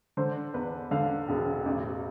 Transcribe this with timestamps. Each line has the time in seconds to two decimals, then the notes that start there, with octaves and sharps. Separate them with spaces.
0.17 D3 C5
0.54 E2 B4
0.91 D3 F5
1.28 E1
1.66 A1